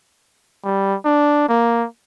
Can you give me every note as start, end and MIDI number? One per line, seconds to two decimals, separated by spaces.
0.64 0.96 55
1.05 1.47 62
1.49 1.86 58